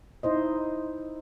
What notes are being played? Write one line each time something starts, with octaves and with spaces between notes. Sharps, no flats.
D#4 E4 C5 D#5